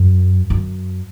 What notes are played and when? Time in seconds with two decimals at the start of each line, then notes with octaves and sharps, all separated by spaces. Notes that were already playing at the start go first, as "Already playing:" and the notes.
Already playing: F#2
0.50 F#2